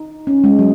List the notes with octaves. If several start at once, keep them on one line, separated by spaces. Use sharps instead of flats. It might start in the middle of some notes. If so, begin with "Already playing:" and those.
Already playing: D#4
C#4
G#3
F#3